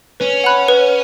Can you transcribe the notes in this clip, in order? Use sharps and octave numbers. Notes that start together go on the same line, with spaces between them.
C#4 B4
F#5 B5 F#6
B4